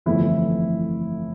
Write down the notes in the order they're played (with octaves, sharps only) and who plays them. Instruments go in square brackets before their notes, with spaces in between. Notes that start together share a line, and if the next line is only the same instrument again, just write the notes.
[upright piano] G1 F2 E3 A3 [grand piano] E4